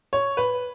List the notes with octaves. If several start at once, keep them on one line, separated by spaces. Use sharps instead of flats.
C#5
B4